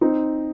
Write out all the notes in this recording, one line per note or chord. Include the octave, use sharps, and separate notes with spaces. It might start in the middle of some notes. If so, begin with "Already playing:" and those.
C4 D#4